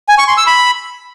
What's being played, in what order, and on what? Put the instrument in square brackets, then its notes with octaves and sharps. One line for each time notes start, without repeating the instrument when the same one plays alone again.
[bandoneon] G#5
C#6
C6
E6
B5